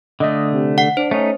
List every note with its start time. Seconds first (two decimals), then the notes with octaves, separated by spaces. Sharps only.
0.20 D3 A3 D#5
0.52 C3
0.78 F#5 C7
0.97 D4 C5
1.11 A3 C#4 D#4